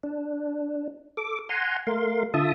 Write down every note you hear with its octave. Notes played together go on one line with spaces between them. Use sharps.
D4
A4 D6
F#5 G#5 A#5 C6
A3 A#4 F5 C6
D3 F4 E5 A5 D#6